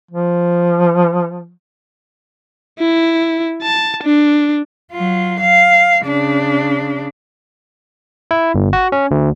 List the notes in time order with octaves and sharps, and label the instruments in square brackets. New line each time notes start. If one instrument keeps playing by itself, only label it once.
[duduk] F3
[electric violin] E4
A5
D4
[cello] F#3 F4
F5
C#3 D4
[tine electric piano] E4
G1
F#4
C#4
D2